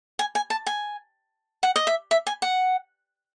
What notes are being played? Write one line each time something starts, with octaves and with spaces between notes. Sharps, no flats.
G#5
G#5
A5
G#5
F#5
D#5
E5
E5
G#5
F#5